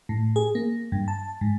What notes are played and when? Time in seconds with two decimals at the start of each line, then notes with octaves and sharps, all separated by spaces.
0.09 A2
0.36 G#4
0.55 A#3
0.92 G2
1.08 A5
1.41 G#2